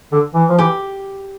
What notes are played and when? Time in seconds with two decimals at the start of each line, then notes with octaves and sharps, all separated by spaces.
0.12 D3
0.34 E3
0.49 F3
0.58 E3 G4